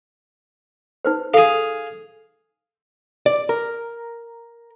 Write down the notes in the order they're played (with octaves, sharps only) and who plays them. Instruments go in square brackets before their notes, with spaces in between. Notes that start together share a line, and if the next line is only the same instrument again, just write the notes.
[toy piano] D#4 B4 C5
[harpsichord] G#4 F5 [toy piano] A4
[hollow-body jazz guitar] D5
A#4